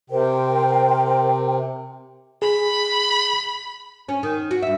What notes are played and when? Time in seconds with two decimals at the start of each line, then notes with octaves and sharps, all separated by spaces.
0.10 C3 A#4 C5 G5
2.42 G#4 B5
4.09 C#4
4.23 D#3
4.51 F#4
4.62 G2 E5